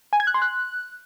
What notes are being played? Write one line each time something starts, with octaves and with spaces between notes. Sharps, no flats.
G#5
G#6
F#6
C6
F#6